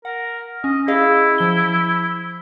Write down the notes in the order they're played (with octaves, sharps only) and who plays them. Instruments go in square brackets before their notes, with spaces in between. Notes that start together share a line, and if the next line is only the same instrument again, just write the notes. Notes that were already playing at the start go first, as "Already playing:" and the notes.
[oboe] A#4 [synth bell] F#5
[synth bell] C#4 [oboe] D#5
[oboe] E4 [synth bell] G#4 D#5 F5
[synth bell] F3 G7